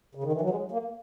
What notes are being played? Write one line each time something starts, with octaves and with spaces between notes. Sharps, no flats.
C#3
D#3
E3
F#3
G#3
A#3